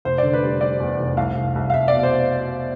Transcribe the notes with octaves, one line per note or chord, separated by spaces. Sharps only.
F1 C5
D3 D5
B4
G3
G3 D5
E2
F1
C2 F5
C2
C2
F5
C2 E5
D5
B2
C5